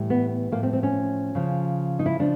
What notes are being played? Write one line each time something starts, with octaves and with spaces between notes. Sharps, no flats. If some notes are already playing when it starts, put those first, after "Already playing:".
Already playing: A2 E3 G3
B3
A2 F3 A#3
C4
C4
C#4
C#3 F3
D#4
E4
C#3 F3 D4